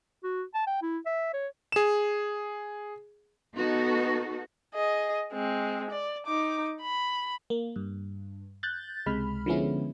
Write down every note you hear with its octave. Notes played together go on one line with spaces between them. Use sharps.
F#4
A5
G5
E4
E5
C#5
G#4 E7
B3 D#4 F#4 A4
G#4 D#5
G#3 C4
D5
D#4 D6
B5
A#3
G2
F#6 G6 A6
C#2 C3 G#3 B5 F6
D3 F3 G#3 B3 C#4 E4